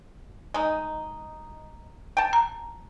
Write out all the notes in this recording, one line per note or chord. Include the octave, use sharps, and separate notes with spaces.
G#3 D#4
G5 A5
A#5